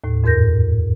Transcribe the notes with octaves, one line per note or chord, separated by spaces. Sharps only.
D#2 A2
F2 G#2 A#4 G6 A#6